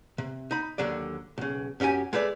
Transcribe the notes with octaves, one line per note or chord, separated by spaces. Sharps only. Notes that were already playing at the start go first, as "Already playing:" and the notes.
C3
D#4 B5
D#2 D3 F#3 D5
B1 C#3
F#2 C#4 F#4 G4 G#5
G#3 A3 B4 D5